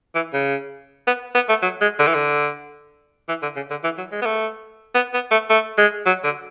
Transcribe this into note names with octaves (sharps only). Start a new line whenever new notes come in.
E3
C#3
B3
B3
A3
F#3
G#3
D3
E3
D3
E3
D3
C#3
D3
E3
F#3
G#3
B3
A3
B3
B3
A3
A3
G#3
F#3
D3